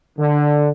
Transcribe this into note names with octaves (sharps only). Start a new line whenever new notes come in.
D3